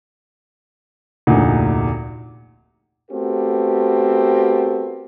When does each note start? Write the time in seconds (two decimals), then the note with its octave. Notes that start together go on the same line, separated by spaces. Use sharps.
1.27 F1 D2 A#2 D#4
3.11 A3 B3 C4 F#4 G4 A#4